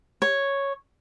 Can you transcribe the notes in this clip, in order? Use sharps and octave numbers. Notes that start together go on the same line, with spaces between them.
C#5